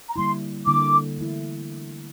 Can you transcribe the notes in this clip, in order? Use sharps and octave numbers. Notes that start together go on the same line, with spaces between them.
A#5
D3 G3 A#3 E4 C6
D3 G3 A#3 E4 D6
E3 A3 E4